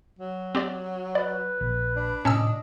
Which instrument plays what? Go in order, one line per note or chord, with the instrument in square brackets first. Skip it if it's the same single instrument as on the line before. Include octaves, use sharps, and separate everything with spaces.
[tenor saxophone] F#3
[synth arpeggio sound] C4 G4 D5
[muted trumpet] B4 [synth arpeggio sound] D5
[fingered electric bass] A#1
[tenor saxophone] D4
[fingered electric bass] A2 C3 [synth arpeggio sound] C#4 A5 E6 [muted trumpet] D#5